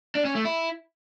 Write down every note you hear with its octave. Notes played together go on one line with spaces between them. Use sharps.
D4
C#4
A3
E4